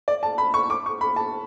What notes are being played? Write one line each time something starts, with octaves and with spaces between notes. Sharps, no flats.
D5
A5
B5
C#6
D6
C#6
B5
A5